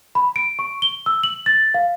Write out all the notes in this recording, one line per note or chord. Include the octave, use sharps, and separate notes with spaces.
B5
D7
C#6
G7
E6
F#7
A6
F5